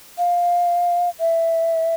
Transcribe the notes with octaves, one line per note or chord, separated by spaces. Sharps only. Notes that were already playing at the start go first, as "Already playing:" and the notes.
F5
E5